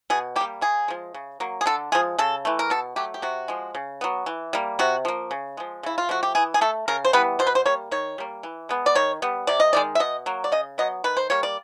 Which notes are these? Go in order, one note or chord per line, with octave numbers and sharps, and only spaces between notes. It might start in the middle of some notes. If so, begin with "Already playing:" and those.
B2 G#4
A#3 G4
G3
C#3 G#4
F3 G#3
C#3
F#3 A#3
G#4
D3 A4
F3 G#3 G#4
C#3 A4
E3 A3
A#4
B2 A4
F#3 A3 G4
G4
C3 F#4
F3 G#3
C#3
F#3 B3
E3
G3 A#3
C3 F#4
F3 A#3
C#3
F3 G#3
C#3 E4
F4
F3 A3 F#4
G4
E3 G#4
G#4
A3 A4
C#3 A#4
C5
E3 G3 B3 B4
B2 C5
B4
C5
G3 A#3 C#5
D#3 C#5
G3 A#3
E3
G#3 B3
D5
D#3 C#5
G3 B3
C3 D5
D#5
D#3 G#3 D5
E5
B2 D#5
F#3 A#3
D5
C#3 D#5
F#3 B3 D#5
D#3 B4
C5
G3 A#3 C#5
D5